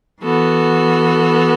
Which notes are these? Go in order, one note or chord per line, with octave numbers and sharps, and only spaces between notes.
E3 B3 F#4 A4